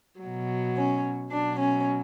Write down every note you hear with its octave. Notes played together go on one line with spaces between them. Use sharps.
B2 F#3
C#4
B2 F#3 D4
C#4